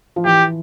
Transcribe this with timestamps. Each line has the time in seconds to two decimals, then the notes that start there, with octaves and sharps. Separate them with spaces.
0.16 F3
0.25 E3 G4